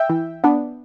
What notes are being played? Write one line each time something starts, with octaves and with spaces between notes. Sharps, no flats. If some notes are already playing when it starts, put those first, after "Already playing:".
Already playing: E5 G5
E3
B3 D4